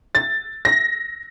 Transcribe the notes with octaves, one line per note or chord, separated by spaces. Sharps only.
A6
A#6